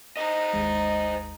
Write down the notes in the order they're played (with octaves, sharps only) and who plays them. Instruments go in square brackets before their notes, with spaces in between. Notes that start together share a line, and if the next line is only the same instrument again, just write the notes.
[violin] D#4 [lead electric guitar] C5 D#5
[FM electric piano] G#1 D#2 G#3